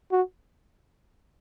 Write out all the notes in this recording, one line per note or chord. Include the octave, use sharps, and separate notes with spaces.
F#4